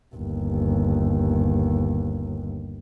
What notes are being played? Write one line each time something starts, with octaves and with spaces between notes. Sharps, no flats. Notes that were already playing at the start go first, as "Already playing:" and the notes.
G1 D#2